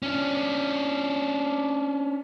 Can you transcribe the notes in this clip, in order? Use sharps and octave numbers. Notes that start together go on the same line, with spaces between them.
C#4 D4